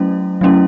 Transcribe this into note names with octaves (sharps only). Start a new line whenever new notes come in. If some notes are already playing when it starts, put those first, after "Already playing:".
Already playing: F#3 A3 C#4 E4
F#3 A3 C#4 E4